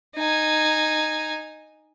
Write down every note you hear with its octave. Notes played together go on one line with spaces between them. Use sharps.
D#4 G#5